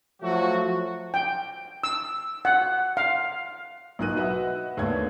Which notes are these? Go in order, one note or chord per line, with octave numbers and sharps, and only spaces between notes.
F3 F#3 A3 F#4
G5
E6
F#5
F5
B1 B2 D#4 A#4 F#6 D#7
F#4 B4 D#5 E5 F#5
D#2 A3 B3 D4 C#5 G#6